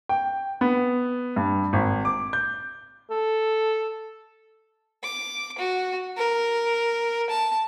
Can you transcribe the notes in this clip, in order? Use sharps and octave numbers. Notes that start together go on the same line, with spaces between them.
G5
B3
G2
G#1
D6
G6
A4
D6
F#4
A#4
A5